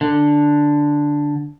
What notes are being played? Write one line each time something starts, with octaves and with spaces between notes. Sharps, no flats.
D3